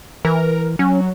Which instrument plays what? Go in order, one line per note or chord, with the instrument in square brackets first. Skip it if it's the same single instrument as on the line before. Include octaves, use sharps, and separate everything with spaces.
[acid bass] E3 [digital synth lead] A#4
[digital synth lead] F#3 [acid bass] C#4